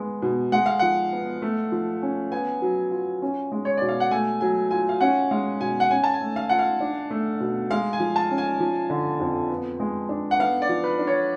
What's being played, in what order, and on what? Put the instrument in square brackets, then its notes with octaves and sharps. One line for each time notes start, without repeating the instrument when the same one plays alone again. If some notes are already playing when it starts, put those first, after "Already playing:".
Already playing: [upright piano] G#3 B3
B2
[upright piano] G#3 [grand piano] F#5
[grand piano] F5
[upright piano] F3 [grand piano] F#5
[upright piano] B3
A3
F3
C#4
[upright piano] B3 [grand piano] G#5
[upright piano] F#3
F4
C#4
G#3
[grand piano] C#5
[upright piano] B2 [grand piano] D5
[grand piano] F5
F#5
[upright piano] A3 [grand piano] G#5
[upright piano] F#3 [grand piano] G#5
[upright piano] F4 [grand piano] G#5
[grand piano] F5
[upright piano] C#4 [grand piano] F#5
[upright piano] G#3 [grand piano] F5
[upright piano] B2 [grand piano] G#5
[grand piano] F#5
[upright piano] C#4 [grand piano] G#5
[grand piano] A5
G#5
[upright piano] A3
[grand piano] F5
[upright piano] F4 [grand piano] F#5
[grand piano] F5
[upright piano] D4
A3
B2
[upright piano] G#3 [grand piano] F5
[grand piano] G#5
[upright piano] F3
[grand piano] A5
[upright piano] C#4
[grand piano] G#5
[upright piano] F3
D3
F2
B3
G#3
D4
[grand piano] F#5
[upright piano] B3 [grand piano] F5
[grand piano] D5
[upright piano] F3
[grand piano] B4
[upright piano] D4
[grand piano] C#5